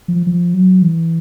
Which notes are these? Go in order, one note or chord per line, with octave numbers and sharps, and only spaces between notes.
F3
F3
F#3
E3